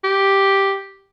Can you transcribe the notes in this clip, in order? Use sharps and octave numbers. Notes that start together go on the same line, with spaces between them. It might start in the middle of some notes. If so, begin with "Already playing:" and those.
G4